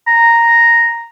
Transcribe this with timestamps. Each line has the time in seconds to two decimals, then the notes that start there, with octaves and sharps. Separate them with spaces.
0.07 A#5